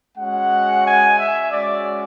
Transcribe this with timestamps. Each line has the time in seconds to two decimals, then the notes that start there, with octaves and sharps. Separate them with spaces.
0.17 G#3 C#4 F#4 F#5
0.85 G#5
1.18 E5
1.52 G#3 C#4 F#4 D5